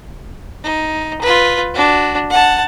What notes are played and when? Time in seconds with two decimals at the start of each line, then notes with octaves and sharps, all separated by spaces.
0.64 D#4
1.21 F4 B4
1.74 D4 F#4
2.30 F#5 A5